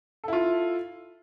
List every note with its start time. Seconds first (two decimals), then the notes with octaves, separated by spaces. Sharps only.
0.24 A4
0.28 E4
0.33 F4